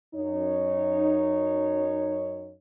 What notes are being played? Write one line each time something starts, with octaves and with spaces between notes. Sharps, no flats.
F#2 D#4 C#5